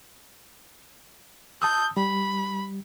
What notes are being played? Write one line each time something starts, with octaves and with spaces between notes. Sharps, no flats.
A5 D#6 E6 G6
G3 B5